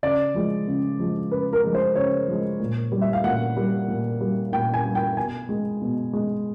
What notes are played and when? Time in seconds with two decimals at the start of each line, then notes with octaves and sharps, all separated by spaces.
0.03 C#3 D5
0.35 F3 G#3
0.67 C#3
0.99 F3 G#3
1.31 C#3 B4
1.53 A#4
1.64 F3 G#3
1.75 C5
1.96 C#3 C#5
2.28 F3 G#3
2.60 A#2
2.92 G3
3.01 E5
3.13 F5
3.24 A#2 F#5
3.57 G3
3.88 A#2
4.21 G3
4.52 A#2 G5
4.74 G#5
4.85 G3
4.95 G5
5.17 B2 G#5
5.49 G#3
5.82 B2
6.13 G#3